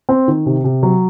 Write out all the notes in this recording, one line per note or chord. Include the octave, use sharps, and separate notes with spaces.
C4
D#3
C3
C3
F#3